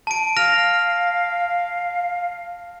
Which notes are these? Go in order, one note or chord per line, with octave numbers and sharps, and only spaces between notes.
A5 D7
F5 F6 A#6 F7